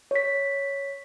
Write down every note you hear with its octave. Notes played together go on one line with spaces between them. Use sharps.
C#5 B6